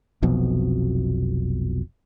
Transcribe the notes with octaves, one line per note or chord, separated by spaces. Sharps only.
F1 B1 F2 B2